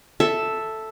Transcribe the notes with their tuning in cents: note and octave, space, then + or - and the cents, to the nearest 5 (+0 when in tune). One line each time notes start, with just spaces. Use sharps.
A4 +0 E5 +0